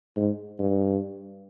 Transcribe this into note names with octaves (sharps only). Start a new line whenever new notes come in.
G#2
G2